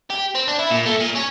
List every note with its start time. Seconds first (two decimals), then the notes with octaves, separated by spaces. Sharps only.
0.10 G4
0.35 C4
0.48 D4
0.59 E4
0.70 A#2
0.86 A3
1.01 A#2
1.15 C#4